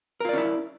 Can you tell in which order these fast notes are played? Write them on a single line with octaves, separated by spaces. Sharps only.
A#4 F4 D5 C#4 E4